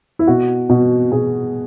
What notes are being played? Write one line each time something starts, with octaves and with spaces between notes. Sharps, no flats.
E4
B2 F#4
B2
B2 G#4